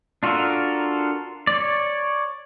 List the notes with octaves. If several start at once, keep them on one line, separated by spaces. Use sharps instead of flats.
D4 F4 F#4 A4 A#4
C#5 D5